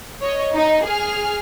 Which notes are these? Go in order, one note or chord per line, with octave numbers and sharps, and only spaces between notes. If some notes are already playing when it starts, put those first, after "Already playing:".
C#5 D#5
D#4
G#4 F6